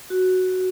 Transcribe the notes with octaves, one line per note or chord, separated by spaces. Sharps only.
F#4